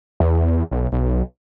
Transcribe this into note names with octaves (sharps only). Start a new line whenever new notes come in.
E2
B1
B1